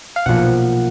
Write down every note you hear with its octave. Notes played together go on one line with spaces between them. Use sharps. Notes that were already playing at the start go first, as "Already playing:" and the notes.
F5
B1 A#2 F3 A#3 F#5